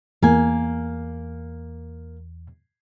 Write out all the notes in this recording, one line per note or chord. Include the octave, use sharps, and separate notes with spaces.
E2 A#3 G#5